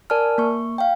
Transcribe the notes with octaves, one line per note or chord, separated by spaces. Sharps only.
A#4 D5 G#5 A5 F6
A#3 C#6
F5 G5